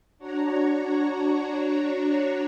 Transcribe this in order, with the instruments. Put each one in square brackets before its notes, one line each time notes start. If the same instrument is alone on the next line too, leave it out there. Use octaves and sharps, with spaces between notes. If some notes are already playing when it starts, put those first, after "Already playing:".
[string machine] D4 F#4 C#5 A#5